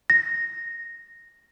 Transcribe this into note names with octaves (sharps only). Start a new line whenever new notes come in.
A#6